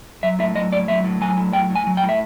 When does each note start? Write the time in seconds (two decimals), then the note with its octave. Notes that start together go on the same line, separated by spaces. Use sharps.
0.23 F#3 E5
0.39 A2 E5
0.55 F#3 D#5
0.72 A2 D5
0.88 F#3 E5
1.04 A2
1.21 F#3 G#5
1.37 A2
1.53 F#3 G5
1.70 A2
1.75 G#5
1.87 F#3
1.97 G5
2.03 A2
2.09 E5